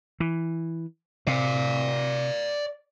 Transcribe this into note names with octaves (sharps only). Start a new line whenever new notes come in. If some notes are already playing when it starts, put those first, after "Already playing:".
E3
C3 D5 F5